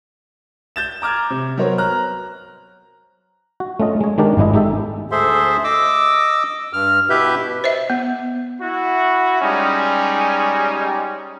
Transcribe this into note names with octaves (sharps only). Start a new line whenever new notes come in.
G6 A6 E7
A#5 D6 F6 G#6
C3
F#3 B3 A#4 C5 C#5
A#5 F6 F#6
F#4
A3 C#4 F4 D#5
G#3 C#5
D#3 G#3 D4 G4 A#4 D5
G#1 G#2 G#3 E4 D#5
G#3 D#4 G4 A4 E5
D2 G#4 A4 C5 E5 C6
D#5 D6 E6
G2 F6
B2 E4 G4 B4 E5 G6
C5 D#5 E5
B3
E4 F#4
G3 G#3 C#4 D#4